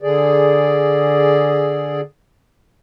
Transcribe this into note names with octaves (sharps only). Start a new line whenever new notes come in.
D3 G#4 D5